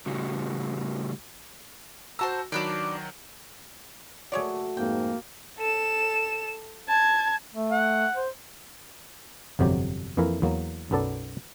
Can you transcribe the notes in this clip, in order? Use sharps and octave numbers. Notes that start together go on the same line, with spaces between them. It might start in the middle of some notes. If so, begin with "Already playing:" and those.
A2 C#3 G3 F#4
F#4 C5 A5 A#5 E6
D#3 F#3 D4 B4 D5
A3 F#4 G#4 C#5 D5
F2 G#2 A#3 G5
A4 E7
A5 G#6
A3
F#5
C5
G1 F2 C3 F#3 G4
F2 E3 A#3 E4 A#4
E2 F#3 A#3
B1 F#2 B3 A4 D5 A5